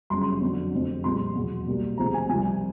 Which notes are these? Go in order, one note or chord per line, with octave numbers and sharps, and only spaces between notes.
G1 F#2 C#3 C6
C6
F2 D3 F#3
F1 F2 C3
C2 A#2 F3 G#3 C6
E2 B2 F#3
C2 B2 G3 A#3
D2 C3 F3 G#3 A#5
G#5
C2 C3 F3 G#5